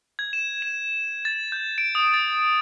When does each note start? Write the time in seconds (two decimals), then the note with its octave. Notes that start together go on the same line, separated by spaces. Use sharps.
0.19 G#6
0.33 E7
0.62 E7
1.25 A6
1.52 G6
1.78 D7
1.95 D#6
2.14 A6